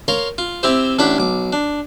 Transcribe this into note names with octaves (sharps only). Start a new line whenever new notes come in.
A#4 C#5 F5 C6
F4
C4 E4 G4 C5
A1 A2 D4 F#5 B5 D6
B1 D6
D4